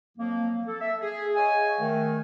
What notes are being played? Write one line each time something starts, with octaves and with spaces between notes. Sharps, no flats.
F2 F3 F#3 A#3
A4
E5
G#4
C#5 D#5 F5 G#5
D#3 A3